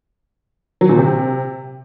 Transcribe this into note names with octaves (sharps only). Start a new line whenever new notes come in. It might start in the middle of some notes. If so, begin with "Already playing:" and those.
F#3
A#2
C3